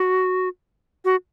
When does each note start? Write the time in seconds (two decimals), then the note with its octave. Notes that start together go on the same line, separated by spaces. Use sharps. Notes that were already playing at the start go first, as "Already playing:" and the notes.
Already playing: F#4
1.05 F#4